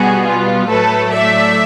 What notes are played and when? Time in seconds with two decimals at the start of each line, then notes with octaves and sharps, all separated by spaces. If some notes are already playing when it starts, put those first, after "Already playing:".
Already playing: B2 G3 B3 F#4 G#4
0.25 F4
0.68 A2 F#3 A3 A4 B4
1.12 D5 E5